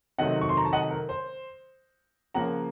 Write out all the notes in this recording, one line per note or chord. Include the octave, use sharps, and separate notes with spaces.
C3 D#3 F#3 A3 C4 D#5 F#5
C#6
C6
A#5
A5
D#5 F#5
A#4
C5
C#3 F3 A#3 F#5 A#5